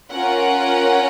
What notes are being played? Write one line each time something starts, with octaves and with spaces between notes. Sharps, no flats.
C#4 F4 A#4 C#5 F#5